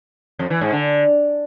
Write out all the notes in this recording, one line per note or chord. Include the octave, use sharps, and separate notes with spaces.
F2
E3
G#2
D3